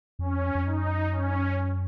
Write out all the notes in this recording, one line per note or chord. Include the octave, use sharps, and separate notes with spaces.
F2 C#4
F2
F#2 D#4
C#4